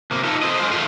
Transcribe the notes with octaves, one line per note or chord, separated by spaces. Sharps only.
C3 A#3
D#4 F4 A4 A#4
A4 C5 D#5
F#2 G#3 F4 C5
D#3 A3 F4